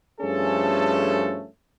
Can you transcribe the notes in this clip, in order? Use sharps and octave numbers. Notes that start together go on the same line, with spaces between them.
G2 F3 A3 C#4 G#4 A4